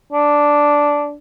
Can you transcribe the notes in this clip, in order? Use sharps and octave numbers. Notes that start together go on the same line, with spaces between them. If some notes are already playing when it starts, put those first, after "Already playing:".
D4